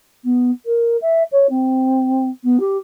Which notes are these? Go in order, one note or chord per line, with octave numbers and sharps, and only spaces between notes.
B3
A#4
E5
C#5
C4
B3
G4